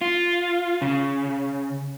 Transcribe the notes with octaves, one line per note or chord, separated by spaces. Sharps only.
F4
C#3